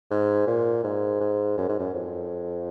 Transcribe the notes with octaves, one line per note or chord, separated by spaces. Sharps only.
G#2
A#2
G#2
G#2
F#2
G#2
F#2
F2